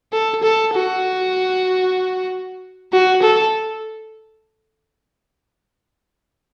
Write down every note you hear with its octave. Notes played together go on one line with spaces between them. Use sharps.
A4
A4
F#4
F#4
A4